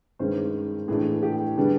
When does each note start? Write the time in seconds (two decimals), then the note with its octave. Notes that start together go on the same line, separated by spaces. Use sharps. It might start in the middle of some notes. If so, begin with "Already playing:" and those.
0.19 G2 D#3 G#3 C#4 C5
0.88 A2 E3 A3 D4 G#4
1.23 G4
1.57 D3 G3 B3 D4 G#4